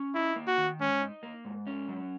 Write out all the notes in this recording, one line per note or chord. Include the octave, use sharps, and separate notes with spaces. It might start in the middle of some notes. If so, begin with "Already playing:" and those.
Already playing: C#4
D#4 E4
A#3
F#4
D#3
G#2 C#4
D#4
A#3
G#2
C#4
F#3